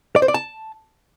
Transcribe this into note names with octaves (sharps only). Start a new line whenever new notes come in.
D5
C5
D5
A5